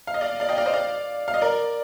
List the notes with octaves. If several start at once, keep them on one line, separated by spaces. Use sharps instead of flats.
F5
D#5
D5 F5
D5 F5
D#5 G5
D5 F5
C5 D#5
D5 F5
F5
D#5
A#4 D5